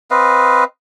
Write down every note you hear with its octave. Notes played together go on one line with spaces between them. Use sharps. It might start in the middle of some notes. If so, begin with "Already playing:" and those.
C4 B4 D#5 F5